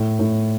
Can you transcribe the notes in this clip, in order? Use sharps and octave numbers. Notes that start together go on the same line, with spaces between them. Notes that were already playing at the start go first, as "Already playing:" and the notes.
Already playing: A2
A2